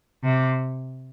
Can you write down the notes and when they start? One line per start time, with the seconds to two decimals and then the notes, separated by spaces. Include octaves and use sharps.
0.23 C3